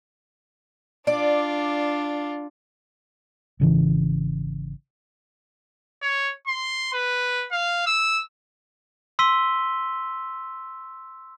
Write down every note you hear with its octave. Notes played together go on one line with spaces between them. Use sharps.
D4 F4 D5
G#1 C#3 E3
C#5
C6
B4
F5
E6
C6 E6 B6 D#7 G7